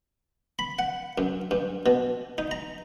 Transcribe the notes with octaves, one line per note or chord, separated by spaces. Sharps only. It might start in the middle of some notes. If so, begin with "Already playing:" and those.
B5
F#5
F#2
G2
B2
D#4
A#5